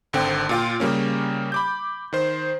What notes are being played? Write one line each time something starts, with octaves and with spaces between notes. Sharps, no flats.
G#1 D3 C4 G5
A#2 F4 G5
C#3 G3 A#3 C#4
B5 D6 G6
D#3 C5